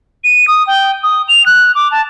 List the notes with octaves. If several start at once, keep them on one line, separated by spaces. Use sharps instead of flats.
D#7
D#6
G5
D#6
F7
F#6
D6
A5